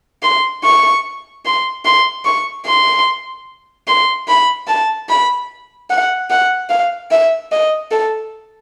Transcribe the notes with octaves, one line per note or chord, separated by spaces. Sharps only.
C6
C#6
C6
C6
C#6
C6
C6
B5
A5
B5
F#5
F#5
F5
E5
D#5
A4